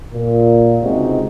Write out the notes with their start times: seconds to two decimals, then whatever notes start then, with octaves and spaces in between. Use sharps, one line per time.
0.14 A#2
0.83 C#2 C3 G#3 C4 D#4 F#4